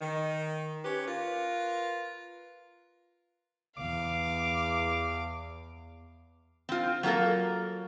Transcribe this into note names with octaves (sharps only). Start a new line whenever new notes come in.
D#3
C#4 G4 B4
F4 A#4 B4
E2 F5 D6
C4 F4
F#3 A#3 F4 A4 A#4